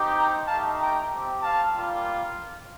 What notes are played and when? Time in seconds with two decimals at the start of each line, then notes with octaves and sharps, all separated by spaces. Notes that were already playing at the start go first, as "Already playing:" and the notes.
Already playing: C4 D#4 G4
0.17 G5 A#5
0.48 A3 D#4 G4 F5 A5
0.80 G5 A#5
1.12 C4 G4
1.43 F5 A5
1.75 G3 A#3 F4